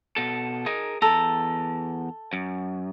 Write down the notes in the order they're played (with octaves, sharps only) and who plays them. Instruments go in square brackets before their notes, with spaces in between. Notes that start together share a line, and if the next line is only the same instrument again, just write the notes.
[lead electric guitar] B2 A4
[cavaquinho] D#4 [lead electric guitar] G#4 A#4
[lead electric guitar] E2 A#5 [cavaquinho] A4
[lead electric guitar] F#2